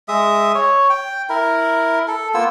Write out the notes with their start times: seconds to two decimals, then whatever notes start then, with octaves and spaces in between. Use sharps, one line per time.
0.08 G#3 E5 D#6
0.55 C#5
0.90 G5
1.29 E4 A#4
2.08 A4
2.34 A#3 B3 F4 E6